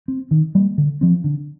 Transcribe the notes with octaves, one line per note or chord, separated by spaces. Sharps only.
C4
D#3
G3 A#3
D3
F3 C4
D3